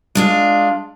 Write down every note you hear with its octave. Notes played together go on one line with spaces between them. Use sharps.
G#3 D4 F4